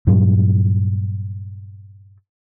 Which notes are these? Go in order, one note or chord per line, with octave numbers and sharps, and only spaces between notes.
G2 A#2 F#3 G3